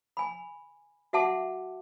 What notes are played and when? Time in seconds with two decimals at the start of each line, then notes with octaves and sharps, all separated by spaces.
0.17 G#5 B5
1.13 F#4 E5 F#5 A5 C6 D6